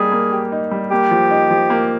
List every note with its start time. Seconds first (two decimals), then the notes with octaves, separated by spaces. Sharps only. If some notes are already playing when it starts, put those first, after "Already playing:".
Already playing: G3 A#3 D#4 G#4
0.12 A#3
0.32 G4
0.52 D#4
0.71 G3
0.91 A#3 G4
1.11 F3
1.31 D#4
1.51 F3
1.70 A#3